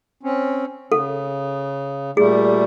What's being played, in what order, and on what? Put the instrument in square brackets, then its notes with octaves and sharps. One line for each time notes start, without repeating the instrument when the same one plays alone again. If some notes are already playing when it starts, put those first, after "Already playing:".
[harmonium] C4 C#4
[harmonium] C#3 [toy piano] A4
[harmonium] A#2 G3 A3 [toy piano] G#4